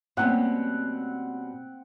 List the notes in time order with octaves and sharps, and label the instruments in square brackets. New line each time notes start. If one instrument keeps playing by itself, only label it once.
[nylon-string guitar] B2 G3 C#4 [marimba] A3 A#3 [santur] C4 F#5 G5